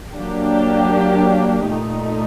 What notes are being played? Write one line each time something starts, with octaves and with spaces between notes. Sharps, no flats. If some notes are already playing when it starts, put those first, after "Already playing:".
F#3 A#3 D4 G4
A#2 A3 D#4